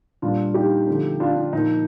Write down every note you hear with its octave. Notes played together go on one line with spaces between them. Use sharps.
A#2 G3 A#3 D4 F4
D#4 G4
D3 F3 A3 C4
D4 F4
D4
A#2 F3 A#3 D#4